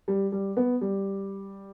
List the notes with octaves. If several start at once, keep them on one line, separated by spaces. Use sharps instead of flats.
G3
G3
B3
G3